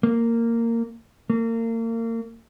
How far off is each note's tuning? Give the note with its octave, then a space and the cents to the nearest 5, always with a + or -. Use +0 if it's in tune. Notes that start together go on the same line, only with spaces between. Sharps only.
A#3 -15
A#3 -35